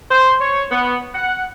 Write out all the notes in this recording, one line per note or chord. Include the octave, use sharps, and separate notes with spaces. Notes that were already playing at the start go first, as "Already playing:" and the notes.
C5
C#5
B3
F#5